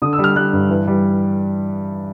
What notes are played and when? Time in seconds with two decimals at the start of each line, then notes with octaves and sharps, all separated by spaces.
0.02 D3 D#6
0.13 E6
0.18 G3
0.24 F6
0.35 G3 F#6
0.53 G2
0.69 E3
0.87 G3